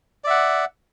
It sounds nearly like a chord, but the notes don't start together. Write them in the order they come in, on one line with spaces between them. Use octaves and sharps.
D5 E5 F#5